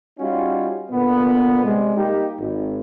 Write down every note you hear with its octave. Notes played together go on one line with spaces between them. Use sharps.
G3 C#4 D#4 F4 F#4
A#2 D3 B3
C3 G3 G#3
G3 A#3 D#4 G4
G#1